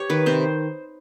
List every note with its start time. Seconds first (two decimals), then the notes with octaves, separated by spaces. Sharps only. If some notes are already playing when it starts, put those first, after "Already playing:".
Already playing: G4 C#5
0.10 D#3 B4
0.26 C3 C5